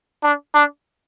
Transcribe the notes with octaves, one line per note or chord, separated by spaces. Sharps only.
D4
D4